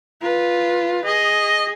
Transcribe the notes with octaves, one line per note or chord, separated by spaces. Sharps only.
F4 B4
G#4 D#5